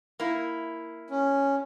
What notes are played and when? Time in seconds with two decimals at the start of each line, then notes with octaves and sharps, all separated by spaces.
0.20 A#3 E4
1.10 C#4